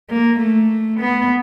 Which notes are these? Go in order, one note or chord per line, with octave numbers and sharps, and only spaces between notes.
A#3
A3
B3